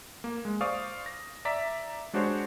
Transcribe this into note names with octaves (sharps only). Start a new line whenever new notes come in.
A#3
G#3
C5 D5 F5 C#6 D#6
A#6
D5 E5 A#5 B6
G#3 D4 F#4 G4 C5 C#5